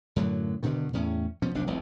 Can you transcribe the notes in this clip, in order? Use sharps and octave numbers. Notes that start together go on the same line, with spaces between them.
F#2 A2 D3 F#3
G2 B2 D3 D#3
E2 A2 C#4
B2 F3 C#4
F1 B1 C3 D4
E1 C2 F2